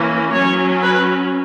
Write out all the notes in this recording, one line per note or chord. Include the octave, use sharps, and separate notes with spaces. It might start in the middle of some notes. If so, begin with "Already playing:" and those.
Already playing: E3 A#3 C#4
F#3 C#4 C#5
B4